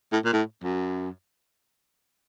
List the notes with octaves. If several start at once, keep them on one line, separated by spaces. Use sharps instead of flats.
A2
A#2
A2
F#2